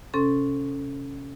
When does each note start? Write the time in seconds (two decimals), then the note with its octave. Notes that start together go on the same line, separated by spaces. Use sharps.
0.14 C3 C#4 A4 C6